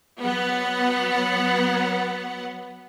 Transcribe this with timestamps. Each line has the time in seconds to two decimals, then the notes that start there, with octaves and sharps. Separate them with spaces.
0.22 F#3 B3 F#5